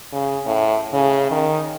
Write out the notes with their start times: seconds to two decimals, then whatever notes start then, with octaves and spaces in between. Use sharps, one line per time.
0.13 C#3
0.46 A2
0.93 C#3
1.31 D#3